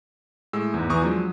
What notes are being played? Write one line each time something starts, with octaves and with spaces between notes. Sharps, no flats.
A2 G#3 E6
E2 G#2
E2 E3 G#5 A#5 C#6 D#6
F3 F#3 G#3 D4